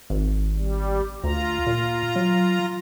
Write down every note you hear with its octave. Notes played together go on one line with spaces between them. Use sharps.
G#1
G3
D2 F4 A#5
A#2
F#3